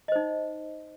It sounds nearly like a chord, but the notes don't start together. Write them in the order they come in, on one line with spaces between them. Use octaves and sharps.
D#5 C5 D#4